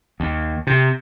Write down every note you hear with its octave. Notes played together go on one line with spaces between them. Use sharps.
D#2
C3